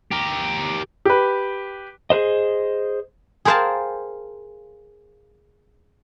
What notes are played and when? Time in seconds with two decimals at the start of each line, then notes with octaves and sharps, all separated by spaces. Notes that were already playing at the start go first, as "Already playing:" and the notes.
0.12 G4 A#4
1.05 G4 B4
2.10 G#4 B4 C5 D#5
3.45 G#4 A#4 C5 F5 G5 A5